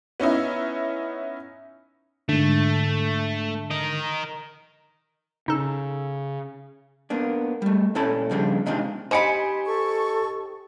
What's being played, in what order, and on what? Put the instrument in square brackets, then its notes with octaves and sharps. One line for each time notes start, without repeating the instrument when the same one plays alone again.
[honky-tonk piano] B3 C#4 D#4 E4
[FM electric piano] G#2 D3 [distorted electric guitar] A3
[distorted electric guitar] A#4 D#5
[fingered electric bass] C#3 [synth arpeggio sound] D#4 A4
[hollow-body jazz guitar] A#3 B3 D4
G3 A3
A#2 C#4 E4 A4 A5 B5
C#3 F3 G3 D4
C3 D#3 G#3 C4 D4 F4
[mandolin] D#4 G4 B5 [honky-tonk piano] C5 G#5 C#7
[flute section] A4 C#6